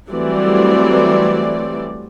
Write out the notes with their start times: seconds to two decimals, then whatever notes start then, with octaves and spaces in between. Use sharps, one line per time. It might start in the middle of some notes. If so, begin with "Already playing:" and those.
0.10 E3 F#3 G3 A3 C4 D5